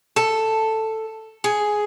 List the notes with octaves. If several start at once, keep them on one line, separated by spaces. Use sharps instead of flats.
A4
G#4